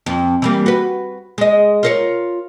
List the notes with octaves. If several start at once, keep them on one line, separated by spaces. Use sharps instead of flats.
F2
E3 G3 A#3
F#4 B4
G#3 D#5
F4 A#4 C#5